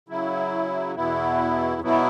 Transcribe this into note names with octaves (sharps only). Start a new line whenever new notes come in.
C#3 F#3 E4
E2 B2 B3 E4
B2 F#3 B3 E4